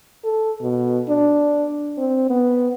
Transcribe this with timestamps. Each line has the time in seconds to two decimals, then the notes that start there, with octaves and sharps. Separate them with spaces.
0.24 A4
0.61 B2
1.08 D4
1.98 C4
2.30 B3